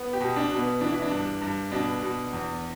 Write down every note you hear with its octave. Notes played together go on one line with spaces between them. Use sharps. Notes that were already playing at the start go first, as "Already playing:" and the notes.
Already playing: B3
G4
B2
D4
B2
B3
E3 D4
E4
D4
G2
G2
B2 D4
B2
E2